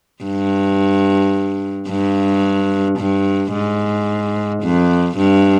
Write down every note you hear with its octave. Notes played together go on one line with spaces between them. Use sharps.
G2
G2
G2
G#2
F2
G2